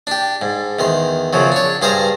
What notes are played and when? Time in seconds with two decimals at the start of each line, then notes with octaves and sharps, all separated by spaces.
0.07 D4 G4
0.41 G#2
0.79 E2 D#3 C6
1.33 F#2 C#3 F3 F#3
1.52 D4 C#5
1.82 G2 G#4 C5 F5 A#5